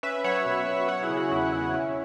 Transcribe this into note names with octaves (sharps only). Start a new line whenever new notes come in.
C#4 B4 E5
F#3 C#5 F#5
B2
B2
F#3 C#5 F#5
E4 G#4
C#3
F#4
E2 E4
E2 E4
C#4